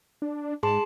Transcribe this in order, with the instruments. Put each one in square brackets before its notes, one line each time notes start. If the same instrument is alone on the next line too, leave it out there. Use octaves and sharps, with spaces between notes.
[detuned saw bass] D4
[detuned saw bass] G#2 [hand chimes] G#4 C6 [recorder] A5